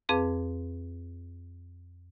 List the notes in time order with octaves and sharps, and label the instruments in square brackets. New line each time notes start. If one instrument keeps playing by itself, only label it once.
[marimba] F2 C4 G#4 B4 F5 D6